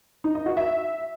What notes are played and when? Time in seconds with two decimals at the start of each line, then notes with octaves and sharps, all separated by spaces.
0.24 D#4
0.35 D#5
0.46 F#4
0.57 E5